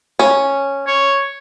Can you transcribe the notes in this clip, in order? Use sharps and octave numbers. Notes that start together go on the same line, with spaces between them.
C#4
C#5